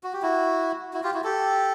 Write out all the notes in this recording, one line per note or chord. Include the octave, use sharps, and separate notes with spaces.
F#4
G4
E4 F#4
E4 F#4
F4 G4
E4 F#4
G4 A4